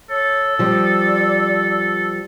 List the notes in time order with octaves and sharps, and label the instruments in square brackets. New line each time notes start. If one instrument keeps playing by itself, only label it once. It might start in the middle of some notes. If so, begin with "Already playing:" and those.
[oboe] A4 [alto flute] C#5
[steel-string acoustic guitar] F3 G3 [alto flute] D5